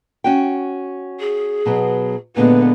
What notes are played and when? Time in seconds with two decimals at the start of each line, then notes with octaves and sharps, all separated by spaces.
0.24 C#4 F#4 G5
1.20 G#4
1.66 B2 F#3 B3
2.37 A#2 D3 G#3 B3 B4